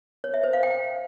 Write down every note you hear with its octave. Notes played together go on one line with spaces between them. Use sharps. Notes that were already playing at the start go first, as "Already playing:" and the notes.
C#5
E5
C5
F5
G5